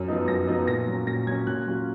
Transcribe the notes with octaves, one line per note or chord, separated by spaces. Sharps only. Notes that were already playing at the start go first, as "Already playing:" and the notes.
Already playing: F#2
F3 B3 D#4
F#2 A#6
F3 B3 D#4
A#2 A#6
F#3 C#4
A#2 A#6
F#3 C#4 G#6
A#2 F#6
F#3 C#4 F4